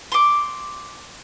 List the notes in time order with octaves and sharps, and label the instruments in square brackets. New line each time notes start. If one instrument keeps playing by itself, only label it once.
[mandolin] C6 D6